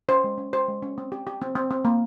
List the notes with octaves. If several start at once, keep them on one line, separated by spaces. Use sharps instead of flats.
C#4 C5
G#3
C#4
G4 C5
G#3
C#4
C4
G4
G4
C4
C4
C4
A#3